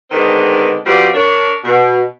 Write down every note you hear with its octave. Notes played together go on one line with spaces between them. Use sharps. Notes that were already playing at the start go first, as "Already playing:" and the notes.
D3 D#3 G#3 B3 C4 D4
F3 G3 B3 C4 F#4 D5
D4 A#4 C#5
B2